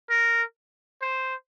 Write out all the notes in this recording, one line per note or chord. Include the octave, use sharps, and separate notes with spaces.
A#4
C5